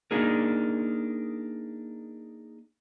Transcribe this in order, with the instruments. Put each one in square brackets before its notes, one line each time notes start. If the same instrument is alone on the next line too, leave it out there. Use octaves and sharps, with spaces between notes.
[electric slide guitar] A#3 D4 D#4 G#4 A#4